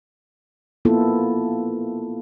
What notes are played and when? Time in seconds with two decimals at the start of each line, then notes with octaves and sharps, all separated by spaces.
0.85 A#3 B3 E4 F4 A4